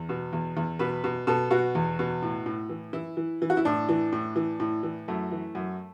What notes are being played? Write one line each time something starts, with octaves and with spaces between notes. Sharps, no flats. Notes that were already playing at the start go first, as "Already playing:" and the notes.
Already playing: E2
B2
E2
E2
B2 B4
B2
B2 A4
B2 F#4
E2
B2
A2
A2
E3
E3 E4
E3
E3
F#4
E4
A2 D4
E3
A2
E3
A2
E3
F#2 A3
E3
F#2